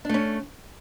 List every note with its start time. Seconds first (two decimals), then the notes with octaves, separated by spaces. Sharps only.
0.05 D4
0.09 A3
0.14 C#4